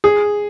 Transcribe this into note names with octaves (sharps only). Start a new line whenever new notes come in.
G#4